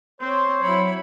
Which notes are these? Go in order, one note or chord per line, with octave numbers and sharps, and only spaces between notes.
C4 C5 C#5
F#3 E4 C#5 B5